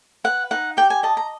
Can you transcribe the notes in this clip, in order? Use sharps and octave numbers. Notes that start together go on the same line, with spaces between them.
B4 F#5
D#4 F#5
G4 G5
G#5
D#5 A5
A#5